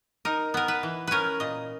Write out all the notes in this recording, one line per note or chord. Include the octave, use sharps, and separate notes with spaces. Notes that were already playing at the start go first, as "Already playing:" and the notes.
D#4 A#4
B3 A#4
B4
E3
C#4 A#4 B4
A#2 D#5